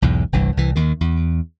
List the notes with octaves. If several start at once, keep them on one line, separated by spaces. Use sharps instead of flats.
B1 E2 G#2
G1 C2 G2 E3
C2 E3
D#2 D#3
E2